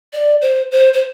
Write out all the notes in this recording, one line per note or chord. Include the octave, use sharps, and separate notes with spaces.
D5
C5
C5
C5